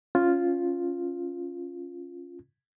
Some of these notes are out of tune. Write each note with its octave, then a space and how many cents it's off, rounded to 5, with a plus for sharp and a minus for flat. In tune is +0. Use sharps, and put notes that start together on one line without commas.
C#4 +0 F4 +0